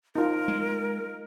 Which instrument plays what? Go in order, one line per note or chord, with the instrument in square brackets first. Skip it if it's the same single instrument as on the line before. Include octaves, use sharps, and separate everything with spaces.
[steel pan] D#4 F4 [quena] A#4
[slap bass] G#3